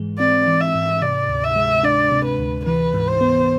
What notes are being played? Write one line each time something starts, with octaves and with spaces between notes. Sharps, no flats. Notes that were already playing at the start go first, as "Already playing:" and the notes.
Already playing: G#2 E3 G#3
C4 D5
E3
E5
G#2
C3 D5
D2
E5
G#3
D4 D5
C3
B4
D2
E3 B4
G#2
C5
B3